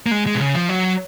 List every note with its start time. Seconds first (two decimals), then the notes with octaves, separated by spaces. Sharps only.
0.06 A#3
0.11 G#3
0.26 G#3
0.35 B2
0.40 C#3
0.55 F3
0.69 F#3